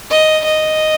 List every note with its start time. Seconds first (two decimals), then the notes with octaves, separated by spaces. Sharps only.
0.11 D#5
0.45 D#5